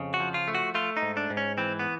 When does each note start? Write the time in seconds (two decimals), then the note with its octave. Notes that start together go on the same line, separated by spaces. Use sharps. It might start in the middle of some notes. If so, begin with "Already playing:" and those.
Already playing: F2 C#3
0.14 F#4
0.20 F3
0.34 F4
0.48 A3
0.55 F#4
0.75 A3 F4
0.97 D#4
1.02 G#2
1.17 D4
1.30 G#2
1.37 C#4
1.58 E3 C4
1.79 B3